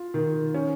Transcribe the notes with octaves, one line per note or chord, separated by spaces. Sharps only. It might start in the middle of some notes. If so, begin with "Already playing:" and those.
Already playing: F4
D#3
C#4